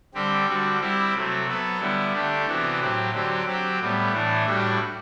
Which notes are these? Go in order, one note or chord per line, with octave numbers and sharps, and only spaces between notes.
D3 G3 C4 G4
D3 G3 C4 F#4
G3 C4 E4 G4
C3 F#3 A3 C4
F#3 B3 F#4 A4
D3 G3 B3 E4
D3 A3 D4 G4
C3 E3 B3 D4 F#4
A2 F#3 C4 G4
D3 F#3 C4 G4
F#3 C4 G4
A2 G3 B3
A2 E3 A3 D4
A2 G3 D4 F#4